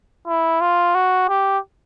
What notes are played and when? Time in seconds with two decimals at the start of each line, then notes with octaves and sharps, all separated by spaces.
0.27 E4
0.61 F4
0.95 F#4
1.29 G4